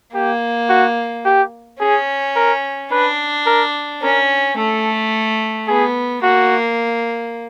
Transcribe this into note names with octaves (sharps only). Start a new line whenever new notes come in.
A#3 G4
F#4
G4
C#4 G#4
A#4
D4 B4
A#4
C#4 A#4
A3 A4
B3 G#4
A#3 F#4